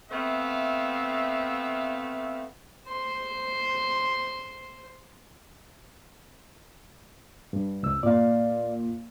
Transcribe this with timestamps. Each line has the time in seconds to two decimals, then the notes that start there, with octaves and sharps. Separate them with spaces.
0.11 A3 B3 C4 E5 F5
2.87 C5 C6
7.53 G2
7.83 C#2 E6
8.03 A#2 D5 F5